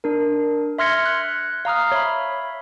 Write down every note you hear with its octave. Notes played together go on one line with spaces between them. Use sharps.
D4 A#4
E5 C6 F6 G#6 A#6 C#7
F#6
F5 A#5 D#6 F6
C#5 E5 B5